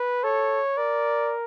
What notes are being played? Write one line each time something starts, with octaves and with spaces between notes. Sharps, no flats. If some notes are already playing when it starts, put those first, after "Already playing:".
Already playing: B4
A4 C#5
A#4 D5